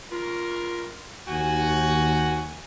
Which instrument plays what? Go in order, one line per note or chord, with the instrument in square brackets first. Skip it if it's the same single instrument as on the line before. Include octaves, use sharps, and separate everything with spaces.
[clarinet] F4 [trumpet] A#4
[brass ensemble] D#2 [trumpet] F#4 [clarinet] G#5